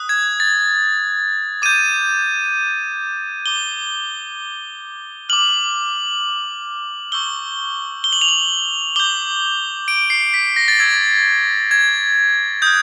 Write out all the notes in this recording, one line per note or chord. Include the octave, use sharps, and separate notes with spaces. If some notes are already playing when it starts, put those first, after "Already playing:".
Already playing: D#6 F#6
G#6
A6
D6 G6 D#7
D6 G6 G7
D6 F6 F#7
C#6 E6 G6 G7
G7
F#7
F7
F#7
D6 G6 G7
D7
C7
B6
A#6
A6
C#6 E6 G6 G#6
G#6
D#6 F#6 G6